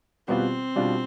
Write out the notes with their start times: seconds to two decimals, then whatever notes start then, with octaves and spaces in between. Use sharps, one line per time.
0.28 B2 G3 B3 C4 F4
0.76 B2 G3 D4 F4